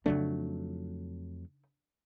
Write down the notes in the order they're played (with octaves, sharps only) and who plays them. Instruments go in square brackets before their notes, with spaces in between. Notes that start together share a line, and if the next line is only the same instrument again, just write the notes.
[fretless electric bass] F2 F#3 A3 [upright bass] C#3 D#4 [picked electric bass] D4